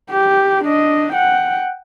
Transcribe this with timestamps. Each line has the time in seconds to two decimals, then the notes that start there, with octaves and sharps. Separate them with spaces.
0.11 G4
0.65 D4 D#5
1.13 F#5 G5